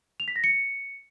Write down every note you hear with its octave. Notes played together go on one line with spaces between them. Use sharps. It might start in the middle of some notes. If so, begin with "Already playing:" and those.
F7
B6
A#6
C#7